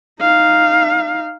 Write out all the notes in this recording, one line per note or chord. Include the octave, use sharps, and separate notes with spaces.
D#4 F5